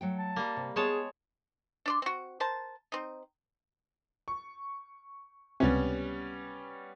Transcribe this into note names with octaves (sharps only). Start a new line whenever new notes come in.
F#3 A3 G5
A5
G3 A#3
C3
G#3 B3 G#4 C#5 A5
D4 D5 C6
C4 F#4
A#4 C5 A5
C4 D#4
C#6
C#2 C3 G3 B3 C#4